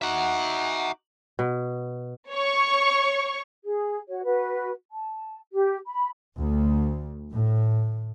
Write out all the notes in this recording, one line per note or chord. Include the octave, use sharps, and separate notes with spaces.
D#4 F#4 E5 F#5 D6
B2
C#5 C#6
G#4
F#4 C#5
F#4 B4
A5
G4
B5
D2
A2